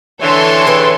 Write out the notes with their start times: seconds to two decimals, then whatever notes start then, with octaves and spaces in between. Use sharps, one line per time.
0.22 D3 E3 A4 C#5 C6
0.67 G#4 B4 G5